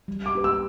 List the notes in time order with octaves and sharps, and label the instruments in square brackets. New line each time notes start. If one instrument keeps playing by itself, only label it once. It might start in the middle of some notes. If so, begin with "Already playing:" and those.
[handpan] G3
[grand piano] D6
[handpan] D4 G4 B4
[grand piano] E6